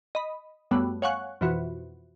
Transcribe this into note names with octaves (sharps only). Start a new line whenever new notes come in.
D#5 B5
F#2 G3 A3 B3
C#5 F5 F#5 G#5 C#6 F#6
F2 B2 E3 F#4